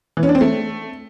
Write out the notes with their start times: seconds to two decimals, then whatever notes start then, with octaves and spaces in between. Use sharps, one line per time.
0.17 E3
0.23 C#4
0.29 D4
0.35 C4
0.41 A3